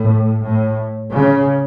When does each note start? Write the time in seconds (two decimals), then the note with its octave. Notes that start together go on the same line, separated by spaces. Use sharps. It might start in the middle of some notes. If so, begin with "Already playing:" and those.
Already playing: A2
0.41 A2
1.11 C#3